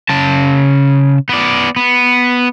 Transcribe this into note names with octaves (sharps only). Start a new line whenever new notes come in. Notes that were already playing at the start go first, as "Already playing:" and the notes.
C#3 A5
B3 D5
B3